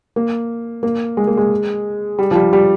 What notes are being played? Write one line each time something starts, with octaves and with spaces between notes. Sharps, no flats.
A#3
A#3
G#3
A#3
G#3
G3
F3
G3
G3